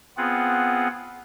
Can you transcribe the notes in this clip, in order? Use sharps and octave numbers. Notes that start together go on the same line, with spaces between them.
B3 C4 F4 G#4 F#5